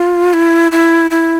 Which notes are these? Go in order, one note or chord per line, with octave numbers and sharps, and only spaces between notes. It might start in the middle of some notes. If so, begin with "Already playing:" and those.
Already playing: F4
E4
E4
E4